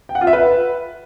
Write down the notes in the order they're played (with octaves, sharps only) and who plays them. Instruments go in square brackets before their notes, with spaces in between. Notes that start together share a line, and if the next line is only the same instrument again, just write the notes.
[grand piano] G5
F#5
F4
E5
B4